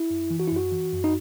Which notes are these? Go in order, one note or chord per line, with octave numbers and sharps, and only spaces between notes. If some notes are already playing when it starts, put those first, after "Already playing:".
Already playing: E4
F#2
E3
F#4
F#2 E4
F#4
E3
F#2
D#4